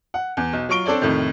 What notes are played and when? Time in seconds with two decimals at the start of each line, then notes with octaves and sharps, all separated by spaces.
0.14 F#5
0.37 E2
0.53 B1
0.69 F#3 F4 C#6 D7 G7
0.86 C4 D4 A4 C#5 D5
1.02 F2 A2 C3 D#3